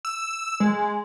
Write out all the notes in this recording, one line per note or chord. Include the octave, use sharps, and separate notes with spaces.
E6
G#3